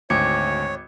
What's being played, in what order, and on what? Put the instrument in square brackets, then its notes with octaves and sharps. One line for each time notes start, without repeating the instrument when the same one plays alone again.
[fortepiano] G#1 [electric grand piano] D2 [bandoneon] C#5 [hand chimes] D6 G#6 C#7